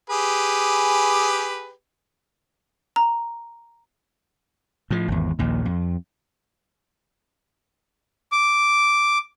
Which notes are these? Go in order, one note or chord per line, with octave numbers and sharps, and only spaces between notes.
G4 G#4 B4
A#5
A2 F3
G#1 E2
A#1 D#2 A#2
F2
D6